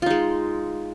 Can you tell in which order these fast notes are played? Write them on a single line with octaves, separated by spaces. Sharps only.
F4 D#4 G#3